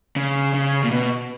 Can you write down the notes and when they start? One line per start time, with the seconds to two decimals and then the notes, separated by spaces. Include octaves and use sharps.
0.16 C#3
0.54 C#3
0.83 A#2
0.91 B2